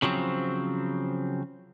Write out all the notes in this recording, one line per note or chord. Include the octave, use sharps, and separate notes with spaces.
C#3 F3 F#3 C4